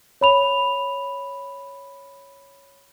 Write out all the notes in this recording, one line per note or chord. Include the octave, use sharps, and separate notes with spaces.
C#5 B5 F7